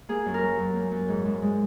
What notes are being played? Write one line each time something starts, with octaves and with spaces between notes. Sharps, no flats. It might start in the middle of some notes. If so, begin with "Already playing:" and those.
A#3 G#4
F#2
A#4
F#3
F#2
A#3
F#2
G#2
G#2
G#3